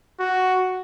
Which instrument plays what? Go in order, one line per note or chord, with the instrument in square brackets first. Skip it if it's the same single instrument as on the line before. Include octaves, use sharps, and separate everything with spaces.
[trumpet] F#4